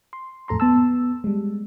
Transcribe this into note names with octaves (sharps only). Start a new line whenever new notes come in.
C6
F2 A2 A4 A#5 C6
B3 A5 E6
G3 G#3